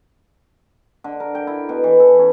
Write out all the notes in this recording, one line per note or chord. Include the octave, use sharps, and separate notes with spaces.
D3
A#4
G5
E4
B2
E3
A4
C#4